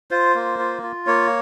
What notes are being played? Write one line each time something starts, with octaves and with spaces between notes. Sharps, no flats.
F4 C5
A#3
F4
F4
A#3 C#5